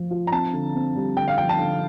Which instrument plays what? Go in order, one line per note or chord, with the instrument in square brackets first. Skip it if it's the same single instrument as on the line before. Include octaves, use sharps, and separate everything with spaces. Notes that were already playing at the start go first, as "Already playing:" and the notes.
Already playing: [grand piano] F3 F4
F4
[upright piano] A#5
[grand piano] C4 [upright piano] A5
[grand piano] D3
C4
G3
[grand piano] D3 [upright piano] G5
[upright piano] F5
[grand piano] F3 [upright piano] G5
[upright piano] A5
[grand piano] D3